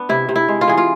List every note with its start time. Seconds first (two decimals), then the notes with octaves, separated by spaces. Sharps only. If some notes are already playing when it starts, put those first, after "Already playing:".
Already playing: B3 D4
0.09 C3 E4
0.29 C3
0.36 E4
0.48 G#3
0.61 F4
0.68 E3 G#4
0.78 F4